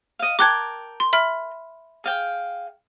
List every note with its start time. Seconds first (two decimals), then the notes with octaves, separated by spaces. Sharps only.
0.19 D#5 F5
0.39 A#4 G5 A5 D6 F#6 G#6
1.00 C6
1.13 E5 B5 F6
2.04 G#4 F5 G5